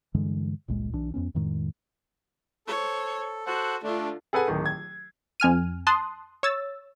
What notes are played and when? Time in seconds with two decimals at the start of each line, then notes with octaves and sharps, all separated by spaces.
0.14 G2 D3 E3 G#3
0.68 G1 C#2 A#2 G#3
0.93 B1 E3 D4
1.14 F2 B2 B3 C#4
1.35 F2 A2 D#3 G#3
2.67 A4 C5 C#5
3.47 F#4 A4 C5 F#5
3.83 D3 A3 D4 F4
4.33 G#4 A4 B4 F#5 G#5
4.48 D1 D#3
4.66 G#6
5.40 F2 G#5 F6 D#7
5.87 A5 C6 D#6 F#6
6.43 C#5 E6 A6